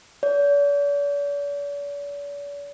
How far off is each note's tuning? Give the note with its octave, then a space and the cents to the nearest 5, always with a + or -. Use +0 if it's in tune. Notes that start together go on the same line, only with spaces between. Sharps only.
D5 -45